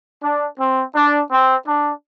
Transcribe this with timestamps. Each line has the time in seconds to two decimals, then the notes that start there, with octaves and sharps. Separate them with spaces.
0.22 D4
0.58 C4
0.95 D4
1.31 C4
1.67 D4